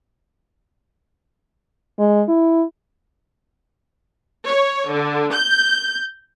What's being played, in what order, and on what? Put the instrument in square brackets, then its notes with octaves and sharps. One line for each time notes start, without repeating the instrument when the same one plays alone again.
[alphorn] G#3
E4
[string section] C#5
D3
G6